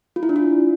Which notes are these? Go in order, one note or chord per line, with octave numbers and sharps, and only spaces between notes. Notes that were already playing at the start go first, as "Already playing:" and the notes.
F4
E4
D4
F4